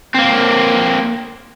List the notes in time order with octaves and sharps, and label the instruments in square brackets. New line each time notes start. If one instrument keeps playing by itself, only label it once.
[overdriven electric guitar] A#3 C4